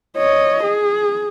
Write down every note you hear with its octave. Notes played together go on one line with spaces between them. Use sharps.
C#5 D#5
G#4